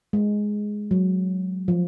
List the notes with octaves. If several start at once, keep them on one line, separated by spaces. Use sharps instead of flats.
G#3
F#3
F3